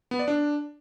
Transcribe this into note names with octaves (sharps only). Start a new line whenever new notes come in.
B3
D5
D4